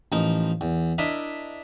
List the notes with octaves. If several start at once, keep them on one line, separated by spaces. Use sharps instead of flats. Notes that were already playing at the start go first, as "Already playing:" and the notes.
A1 F3 D#4 A#4
E2
D4 E4 A#4 D#5 E5